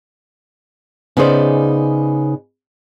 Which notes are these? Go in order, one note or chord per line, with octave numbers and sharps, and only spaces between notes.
C#3 B3 D#4 G#4 C5 D5